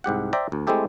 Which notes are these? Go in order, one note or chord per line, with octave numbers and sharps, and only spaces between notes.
C2 G#2 G4 F#5
C5 D5 E5 G5 A#5
D2
G#3 A3 C4 E4 G4 A4